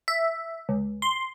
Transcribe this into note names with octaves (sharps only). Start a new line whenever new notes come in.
E5
C#2
C6